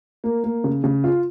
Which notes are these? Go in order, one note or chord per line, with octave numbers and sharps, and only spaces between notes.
A#3
A#3
C#3
C#3
F4